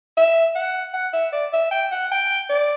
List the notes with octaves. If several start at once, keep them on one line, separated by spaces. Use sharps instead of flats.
E5
F#5
F#5
E5
D5
E5
G5
F#5
G5
D5